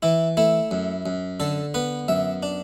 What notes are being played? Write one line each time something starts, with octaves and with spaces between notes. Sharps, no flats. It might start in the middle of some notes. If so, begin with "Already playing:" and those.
E3 E4
A3 E4
F#2
F#2
D3 A4
B3 B4
F#2 E5
D4